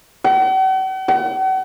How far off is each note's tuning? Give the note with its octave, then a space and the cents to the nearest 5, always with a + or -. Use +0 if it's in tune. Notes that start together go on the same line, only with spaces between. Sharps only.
F#5 +45
F#5 +40